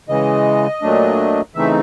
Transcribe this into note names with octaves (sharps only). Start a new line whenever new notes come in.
C#3 E3 G#3 D#5
A#2 F#3 A3 D4
C#3 E3 A3 C4 D#4 E5